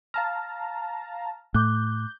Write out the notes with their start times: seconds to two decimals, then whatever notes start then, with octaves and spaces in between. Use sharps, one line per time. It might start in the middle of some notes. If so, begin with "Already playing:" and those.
0.14 F5 A5 A#5 F6
1.54 A2 D6 F#6 G6